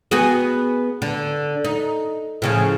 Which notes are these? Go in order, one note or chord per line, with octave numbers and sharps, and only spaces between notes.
B3 F#4 G#4
D3
D#4
A2 C#3 F3